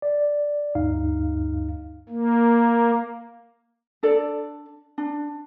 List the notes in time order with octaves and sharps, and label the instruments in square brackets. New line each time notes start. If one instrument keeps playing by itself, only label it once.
[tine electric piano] D5
D2 G2 D#4 F5
[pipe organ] A#3
[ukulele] D4 A4 D5
D4